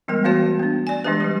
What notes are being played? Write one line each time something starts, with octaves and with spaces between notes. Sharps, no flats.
E3 G3 G#3 B3 A#4
E3 A3 B3 F#4 C#5 A5
B3 D4
D5 G#5
E3 G#3 D4 G4 B4
G3 G4